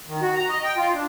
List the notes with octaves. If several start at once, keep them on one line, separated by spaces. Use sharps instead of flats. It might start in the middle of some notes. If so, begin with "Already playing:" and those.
D#3
F#4
A#5
D#5
G5
F4
D4